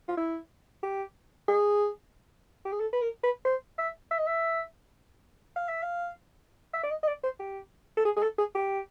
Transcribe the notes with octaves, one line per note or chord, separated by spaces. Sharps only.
F4
E4
G4
G#4
G4
G#4
A4
B4
A#4
B4
C5
E5
E5
D#5
E5
F5
E5
F5
E5
D5
D#5
D#5
D5
C5
G4
A4
G#4
G#4
A4
G#4
G4